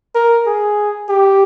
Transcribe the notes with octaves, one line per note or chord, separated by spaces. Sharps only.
A#4
G#4
G4